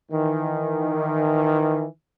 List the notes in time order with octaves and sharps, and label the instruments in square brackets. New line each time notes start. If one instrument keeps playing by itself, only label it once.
[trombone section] D#3 E3